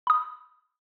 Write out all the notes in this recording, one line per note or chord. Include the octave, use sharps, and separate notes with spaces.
B5 D#6